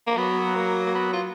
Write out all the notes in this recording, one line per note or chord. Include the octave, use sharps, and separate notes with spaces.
A#3
F#3 B3
A#3
A#3
B3
F4